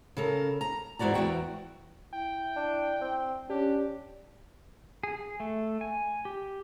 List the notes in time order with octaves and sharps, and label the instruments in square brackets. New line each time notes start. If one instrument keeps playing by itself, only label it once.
[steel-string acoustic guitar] C#3 A4 A#4
A#5
E2 G#2 E4 F#4 D5 A#5
E2 D#3 F#4 G5
[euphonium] E4 [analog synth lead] G5
[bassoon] D4
C4
[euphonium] C#4 [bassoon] D4 [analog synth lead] G4
[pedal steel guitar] G#4
A3
G#5
G4